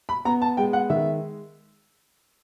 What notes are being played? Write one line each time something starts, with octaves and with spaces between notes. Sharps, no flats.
B5
B3 A#5
A5
G#3 G5
F#5
D#3 E5